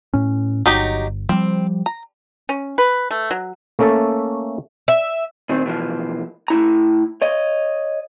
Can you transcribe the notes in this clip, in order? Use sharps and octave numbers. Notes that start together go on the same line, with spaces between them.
A2 C#4
G1 F#3 D#4 G4
F3 G3 C4
A#5
C#4
B4
A3
F#3
A3 A#3 C#4 A4 E5 A5
E5
A#2 D#3 C4
B2 E3 F3
A2 E4 A#5
C#5 D#5